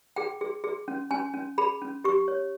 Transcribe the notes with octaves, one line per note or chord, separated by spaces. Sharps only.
G#4 G5
G#4
G#4
C#4
C#4 G#5
C#4
G#4 B5
C#4
G4 C#6
C#5